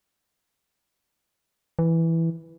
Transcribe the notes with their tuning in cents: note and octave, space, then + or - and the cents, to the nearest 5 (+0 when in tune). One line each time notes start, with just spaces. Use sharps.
E3 +0